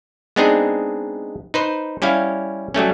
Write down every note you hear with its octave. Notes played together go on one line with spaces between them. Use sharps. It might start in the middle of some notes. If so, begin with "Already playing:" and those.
G#3 B3 C4 D4 D#4 G#4
D#4 B4 C5
G3 C#4 E4 F5
F#3 G3 A3 C#4